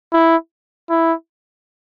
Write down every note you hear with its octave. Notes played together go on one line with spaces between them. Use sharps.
E4
E4